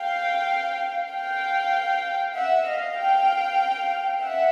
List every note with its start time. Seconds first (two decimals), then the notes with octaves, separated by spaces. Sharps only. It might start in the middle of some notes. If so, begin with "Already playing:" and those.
Already playing: F5 G5
1.11 F5 G5
2.35 E5 F#5
2.66 D#5 F5
2.98 F5 G5
4.22 E5 F#5